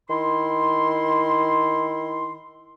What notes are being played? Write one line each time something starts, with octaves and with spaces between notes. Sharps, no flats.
D#3 E4 C6